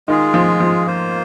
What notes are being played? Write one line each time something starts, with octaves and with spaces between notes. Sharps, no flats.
D#3 G#3 F4 G#4
F3
F3
A#3 F4 C5